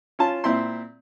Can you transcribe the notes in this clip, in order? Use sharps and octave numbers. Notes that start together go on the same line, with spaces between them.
C#4 F4 A5
A#2 C4 E4 E5 C6